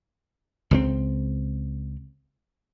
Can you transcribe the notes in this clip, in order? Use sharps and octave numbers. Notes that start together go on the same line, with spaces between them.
C#2 F#3 C4